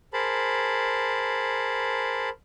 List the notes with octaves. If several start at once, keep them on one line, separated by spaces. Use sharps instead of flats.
G#4 A#4 C5 A5 B5